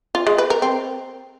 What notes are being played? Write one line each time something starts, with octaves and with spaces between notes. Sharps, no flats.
F4
G#3
B4
A#4
C4